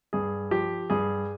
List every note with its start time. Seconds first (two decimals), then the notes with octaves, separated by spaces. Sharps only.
0.13 G2 G#4
0.51 F3 G4
0.90 G2 G#4